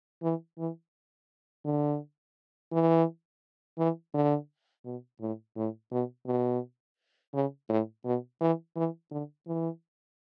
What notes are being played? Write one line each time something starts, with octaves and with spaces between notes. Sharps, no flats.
E3
E3
D3
E3
E3
D3
B2
A2
A2
B2
B2
C#3
A2
B2
E3
E3
D3
E3